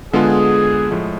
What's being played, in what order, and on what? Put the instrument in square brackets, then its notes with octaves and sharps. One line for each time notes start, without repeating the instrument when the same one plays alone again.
[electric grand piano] D3 G#3 B3 F4 [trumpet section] G#4
[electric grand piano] A2 F3 G#3